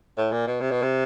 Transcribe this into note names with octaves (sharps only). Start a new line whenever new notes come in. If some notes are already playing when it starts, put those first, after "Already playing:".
A2
A#2
B2
C3
B2
C3